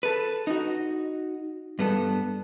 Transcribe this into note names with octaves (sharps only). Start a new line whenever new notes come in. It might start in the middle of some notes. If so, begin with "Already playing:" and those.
A4 B4
D#4 F#4
G2 B3 A4